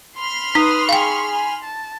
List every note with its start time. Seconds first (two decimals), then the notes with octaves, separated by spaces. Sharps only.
0.19 B5 C6 F6
0.55 D#4 B4 D#6
0.89 G#4 F5 G5 C#6
1.31 G#5
1.64 A5